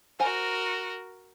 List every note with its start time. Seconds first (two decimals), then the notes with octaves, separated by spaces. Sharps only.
0.20 F#4 A#4 C5 F#5 G#5